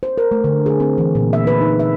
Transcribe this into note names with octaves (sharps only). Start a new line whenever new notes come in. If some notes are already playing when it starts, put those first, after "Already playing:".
C5
A#4
A3
D3
G#4
C4
E3
A#2
E5
B4
D#4
E5